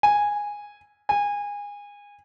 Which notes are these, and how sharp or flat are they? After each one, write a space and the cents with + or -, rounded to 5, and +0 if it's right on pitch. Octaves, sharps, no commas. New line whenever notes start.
G#5 -10
G#5 -25